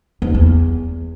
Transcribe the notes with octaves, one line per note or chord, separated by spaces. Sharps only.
D#2
E2